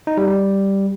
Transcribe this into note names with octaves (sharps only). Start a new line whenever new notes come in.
D#4
G3
G3